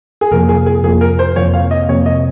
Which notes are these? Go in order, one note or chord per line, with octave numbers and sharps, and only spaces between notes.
G#4
F2 C3 F3 A#3 A#4
G#4
G#4
F2 C3 F3 A#3 G#4
A#4
C5
F2 C3 F3 A#3 C#5
F5
D#5
F2 C3 F3 A#3 C#5
D#5